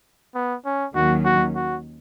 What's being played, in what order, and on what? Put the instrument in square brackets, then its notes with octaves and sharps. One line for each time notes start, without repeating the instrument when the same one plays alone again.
[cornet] B3
C#4
[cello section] D#2 D#3 F#3 C#4 [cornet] F#4
[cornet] F#4
F#4